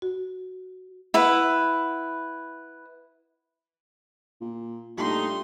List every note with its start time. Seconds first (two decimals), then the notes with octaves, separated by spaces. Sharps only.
0.02 F#4
1.14 E4 B4 F#5
4.41 A#2
4.98 A#2 G3 A3 D4 D#4 C6